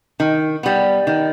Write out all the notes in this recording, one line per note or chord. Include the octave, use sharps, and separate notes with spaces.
D#3
G3 B3
D#3